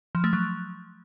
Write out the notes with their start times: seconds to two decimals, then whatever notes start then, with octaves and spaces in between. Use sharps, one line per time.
0.15 F3
0.24 A3
0.33 F#3